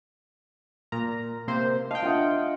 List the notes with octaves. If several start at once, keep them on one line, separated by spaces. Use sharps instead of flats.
A#2 A#5 F6
C3 A#3 C5
D#5 F5 G5 A5
D4 F4 E5 F#5 D#6